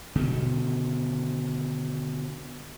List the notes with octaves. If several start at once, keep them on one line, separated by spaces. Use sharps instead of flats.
B2 D3 D#3